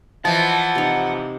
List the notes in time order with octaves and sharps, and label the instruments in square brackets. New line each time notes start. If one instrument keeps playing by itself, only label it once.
[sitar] E3 F3 [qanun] D#5 [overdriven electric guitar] F#5 [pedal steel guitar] A5
[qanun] C3 D#4